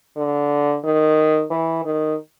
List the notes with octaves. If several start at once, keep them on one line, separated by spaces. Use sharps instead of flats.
D3
D#3
E3
D#3